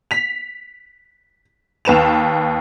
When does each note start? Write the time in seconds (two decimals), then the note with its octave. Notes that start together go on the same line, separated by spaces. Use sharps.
0.11 B6 F7
1.85 D#2 B4 E7 F7